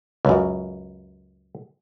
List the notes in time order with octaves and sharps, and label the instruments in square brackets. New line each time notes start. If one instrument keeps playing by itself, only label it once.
[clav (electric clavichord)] C#2 F#2